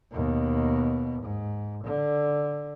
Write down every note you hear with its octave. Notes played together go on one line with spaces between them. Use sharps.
D#2 B2
G#2
D3